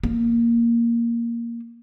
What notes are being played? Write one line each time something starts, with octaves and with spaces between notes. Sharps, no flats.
A#3